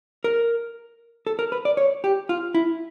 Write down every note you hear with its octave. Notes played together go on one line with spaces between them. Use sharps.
A#4
A4
A#4
B4
D5
C#5
G4
F4
E4